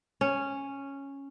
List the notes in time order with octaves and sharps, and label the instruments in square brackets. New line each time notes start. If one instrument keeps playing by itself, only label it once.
[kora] C#4